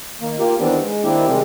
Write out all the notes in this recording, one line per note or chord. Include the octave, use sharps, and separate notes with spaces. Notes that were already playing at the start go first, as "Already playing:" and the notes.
D#3 A#3
A#3 F4 G4 A#4
D#3 E3 G3 B3 C4 D4
G#3
D#3 A#3 C4 D4 E4 G4
C3 D#3 G3 G#3 C4 G4